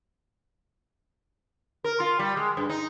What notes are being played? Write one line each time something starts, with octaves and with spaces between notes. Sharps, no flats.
A#4
F4
G3
G#3
G2
D#4